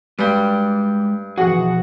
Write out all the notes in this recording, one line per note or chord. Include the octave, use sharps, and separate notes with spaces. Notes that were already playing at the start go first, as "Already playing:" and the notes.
G2 G#3 D5 G5
B2 E3 F3 F#4 G#4 F#5